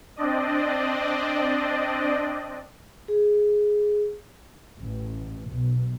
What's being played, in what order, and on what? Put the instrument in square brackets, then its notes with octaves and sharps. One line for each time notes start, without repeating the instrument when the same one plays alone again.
[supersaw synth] C4 D4 D5 D#5
[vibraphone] G#4
[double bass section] A1
B1